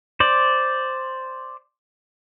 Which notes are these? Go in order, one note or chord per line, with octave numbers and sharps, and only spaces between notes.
C5 D5